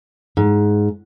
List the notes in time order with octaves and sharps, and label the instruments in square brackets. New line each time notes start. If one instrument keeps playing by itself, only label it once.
[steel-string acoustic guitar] G#2